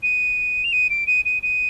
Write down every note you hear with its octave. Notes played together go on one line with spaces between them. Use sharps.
D#7
F7
D#7
D7
D#7
D#7
D#7